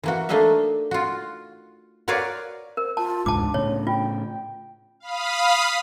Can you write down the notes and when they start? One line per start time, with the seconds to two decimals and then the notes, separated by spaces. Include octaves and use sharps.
0.03 E3 A#3 F#4
0.29 A3 A#3 D4 D#4 D#5 E5
0.91 F4 F#4
2.08 F#4 A#4 B4 C#5 D5 F5
2.77 A#4 C5
2.97 F4 A5
3.26 E1 C#2 G#2 D4 A5 D6
3.54 A2 C#3 C#5
3.87 F4 G5
5.00 F5 B5 D#6